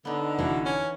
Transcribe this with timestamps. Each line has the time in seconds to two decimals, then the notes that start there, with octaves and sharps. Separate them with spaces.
0.05 D3 B3 D#4
0.39 F1 B2 E3
0.66 C#4